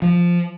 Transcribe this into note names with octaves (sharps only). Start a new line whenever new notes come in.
F3